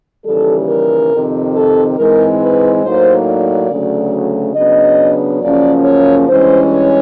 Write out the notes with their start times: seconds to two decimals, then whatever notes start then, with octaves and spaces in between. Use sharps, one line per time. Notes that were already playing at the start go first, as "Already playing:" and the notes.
0.25 D#2 C#3 E3 G3 A4
0.69 A#4
1.11 F2 C3 D#3
1.55 A4
1.97 G#2 E3 G#3 C4 A#4
2.41 B4
2.84 A2 F#3 A#3 D#4 C5
3.27 D5
3.69 D2 C#3 F#3 A3
4.55 C#3 F#3 B3 D4 D#5
5.42 F#2 C#3 F3 A#3 C#4 D5
5.84 C#5
6.27 G2 E3 G#3 C#4 C5
6.71 C#5